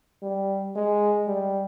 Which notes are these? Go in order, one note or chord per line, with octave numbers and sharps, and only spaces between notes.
G3
G#3
G3